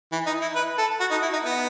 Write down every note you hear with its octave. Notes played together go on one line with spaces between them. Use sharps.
E3
D#4
E4
B4
A4
F#4
D#4
E4
D#4
B3